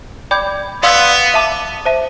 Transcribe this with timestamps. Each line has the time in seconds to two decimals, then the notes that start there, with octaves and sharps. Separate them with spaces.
0.31 D5 G5 B5 D6 G6
0.82 B3 D5 F5 C6 E6
1.34 E5 A5 D6
1.85 C5 E5 A5